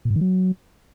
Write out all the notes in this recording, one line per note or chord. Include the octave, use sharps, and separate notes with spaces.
A#2
G#2
D#3
F#3